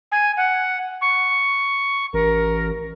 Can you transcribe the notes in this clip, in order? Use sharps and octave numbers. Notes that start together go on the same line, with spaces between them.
G#5
F#5
C#6
A1 A#4